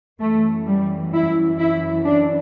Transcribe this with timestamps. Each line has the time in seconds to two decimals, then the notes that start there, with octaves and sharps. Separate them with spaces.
0.20 F#2 E3 A3
0.67 G3
1.13 E4
1.58 E4
2.05 D4